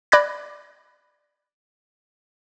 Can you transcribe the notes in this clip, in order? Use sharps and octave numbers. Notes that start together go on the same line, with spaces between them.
D5 B5 D6 F#6 G#6 A#6